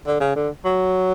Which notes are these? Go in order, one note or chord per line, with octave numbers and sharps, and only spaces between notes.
D3
C#3
D3
F#3